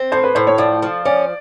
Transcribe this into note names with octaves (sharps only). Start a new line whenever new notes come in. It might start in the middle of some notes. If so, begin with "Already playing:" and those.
Already playing: C4
A2 C5
B4
A2 C5
C#5
F3 D5
F3
C#4 D5